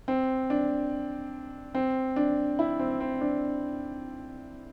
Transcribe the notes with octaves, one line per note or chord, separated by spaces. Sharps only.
C4
D4
C4
D4
E4
C4
C4
D4